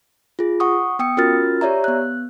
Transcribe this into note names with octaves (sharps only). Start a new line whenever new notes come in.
F4 G#4
F#5 C#6 D#6
B3 G5 D#6 C#7
C#4 F4 F#4 A#4 F6 A6
G4 C#5 D5 E5 A#5
B3 F#6